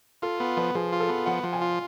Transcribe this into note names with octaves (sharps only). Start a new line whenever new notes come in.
F4 A4
B3 A4
F3 B4
F3 G#4
F4
A4
B3
F3 F#5
F3
G#5
F4